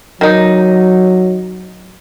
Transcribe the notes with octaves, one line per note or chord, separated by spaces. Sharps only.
D#3 F#3 D#4